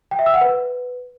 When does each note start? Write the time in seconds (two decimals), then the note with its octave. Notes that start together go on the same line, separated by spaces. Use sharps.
0.11 G5
0.19 E5
0.26 E6
0.34 F#5
0.41 B4